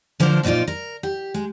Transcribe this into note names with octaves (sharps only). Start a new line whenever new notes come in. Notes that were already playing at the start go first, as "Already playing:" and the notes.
D3 F3 D4 A#4 C5
F2 A#2 D#4 F4 D5
A#4
G4
G#3